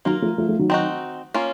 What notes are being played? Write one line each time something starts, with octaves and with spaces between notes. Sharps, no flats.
D#3 F#3 A#3 F4 A#4
F3 A3
F3 A3
F3 A3
D#3 F#3
C4 D#4 F#4
A#3 C#4 F4